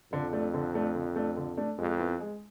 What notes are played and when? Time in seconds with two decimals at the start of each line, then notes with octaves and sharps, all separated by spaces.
0.12 F2 D3
0.33 A3 D4
0.54 D3
0.75 A3 D4
0.95 D3
1.16 A3 D4
1.37 D3
1.57 A3 D4
1.78 F2 G#3
1.99 B3 E4 B4
2.20 G#3